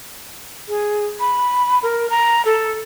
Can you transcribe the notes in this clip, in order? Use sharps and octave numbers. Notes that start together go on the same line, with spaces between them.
G#4
B5
A#4
A#5
A4